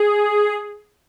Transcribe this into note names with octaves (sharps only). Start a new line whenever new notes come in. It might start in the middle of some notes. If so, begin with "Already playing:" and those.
Already playing: G#4